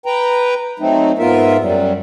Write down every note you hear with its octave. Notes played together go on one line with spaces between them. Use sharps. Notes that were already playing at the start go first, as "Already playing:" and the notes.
B4 G5 A#5
F#3 A3 C4 D#4
G#2 B3 F4 A#4 E5
F#2 F#3 G3